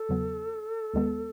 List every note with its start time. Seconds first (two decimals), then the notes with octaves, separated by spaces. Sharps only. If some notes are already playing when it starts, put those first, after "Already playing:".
Already playing: A4
0.09 E2 C#3 F#3 B3
0.94 D#2 D#3 G#3 B3